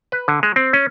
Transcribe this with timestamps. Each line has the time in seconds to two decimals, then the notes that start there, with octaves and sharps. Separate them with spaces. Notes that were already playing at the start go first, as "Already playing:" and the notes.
0.12 B4
0.28 D3
0.43 G#3
0.56 C4
0.73 C#4